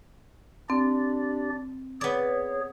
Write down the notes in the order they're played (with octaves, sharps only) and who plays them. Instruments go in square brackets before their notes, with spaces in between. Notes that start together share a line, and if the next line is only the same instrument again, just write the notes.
[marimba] C4 [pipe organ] D4 G4 D5
[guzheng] B3 D5 [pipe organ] G#4 C#5